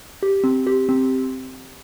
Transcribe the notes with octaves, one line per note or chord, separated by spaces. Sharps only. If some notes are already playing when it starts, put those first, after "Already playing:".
G4
C4
G4
C4